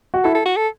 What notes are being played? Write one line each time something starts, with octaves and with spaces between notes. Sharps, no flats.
F#4
E4 A4
A4
F#4
A4